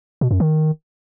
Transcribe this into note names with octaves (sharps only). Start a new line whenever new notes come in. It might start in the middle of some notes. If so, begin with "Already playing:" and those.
B2
F#2
D#3